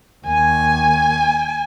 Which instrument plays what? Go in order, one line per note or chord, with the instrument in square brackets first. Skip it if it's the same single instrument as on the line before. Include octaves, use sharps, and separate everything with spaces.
[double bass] D#2 [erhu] G#5